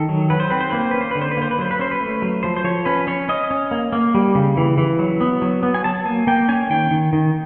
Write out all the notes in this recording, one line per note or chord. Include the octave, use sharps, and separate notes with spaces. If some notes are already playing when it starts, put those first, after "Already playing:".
Already playing: D#3 A4
F#3
F#3 B4
C5
C4 B4
C5
A#3 B4
C5
C#4 B4
C5
D3 B4
C5
B4
A#3 C5
B4
F#3 C5
B4
C#4 C5
B4
A3
F#3
F3 C5
C5
F3 C#5
C#4 B4
C#4 C#5
C#4 D#5
C#4
A#3
A#3
G3
C#3
E3
E3
F#3
B3
F#3
B3
G#5
F#3 A5
A#3 G#5
A#3 G5
C#4 G#5
D#3 G5
D#3
D#3